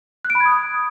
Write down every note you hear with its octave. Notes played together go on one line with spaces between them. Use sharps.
F#6
D7
B5
G#6
D#6